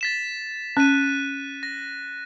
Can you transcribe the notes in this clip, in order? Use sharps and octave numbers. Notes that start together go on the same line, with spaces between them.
A6 B6 E7
C#4 F#6 D#7
A#6